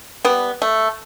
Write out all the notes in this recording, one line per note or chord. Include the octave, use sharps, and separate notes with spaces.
G3 B3
A3